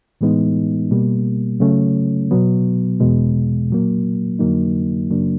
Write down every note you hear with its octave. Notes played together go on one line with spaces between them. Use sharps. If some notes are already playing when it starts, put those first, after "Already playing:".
A2 E3 G#3 B3 D#4
B2 G3 A#3
C#3 F#3 A3 C#4
B2 F#3 B3
E2 B2 G#3
A#2 F#3 A#3
F2 D3 F#3 A#3 D#4
F#2 C#3 F#3 A#3 D4